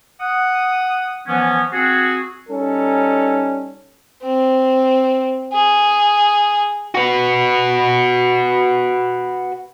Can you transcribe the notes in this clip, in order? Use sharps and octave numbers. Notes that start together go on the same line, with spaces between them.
F#5 D#6
E3 F3 B3 C#4
C4 F#4 G#4
G3 C#4 D#4 A4
C4
G#4
F#4 B4